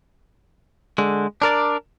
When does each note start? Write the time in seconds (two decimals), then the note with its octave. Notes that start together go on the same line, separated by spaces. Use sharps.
0.98 D3 G#3
1.42 D4 A#4 D5